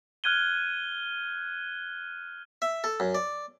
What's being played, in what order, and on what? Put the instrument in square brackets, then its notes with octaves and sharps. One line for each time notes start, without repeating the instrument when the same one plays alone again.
[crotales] F6 F#6 G#6 D#7 G7
[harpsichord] E5
A4
F#2
D5